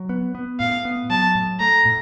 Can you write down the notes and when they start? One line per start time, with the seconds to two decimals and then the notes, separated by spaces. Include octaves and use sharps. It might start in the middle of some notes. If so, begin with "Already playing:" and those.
Already playing: F#3
0.09 B3
0.35 B3
0.60 A2 F5
0.85 B3
1.10 F#3 A5
1.35 A2
1.60 A3 A#5
1.85 A2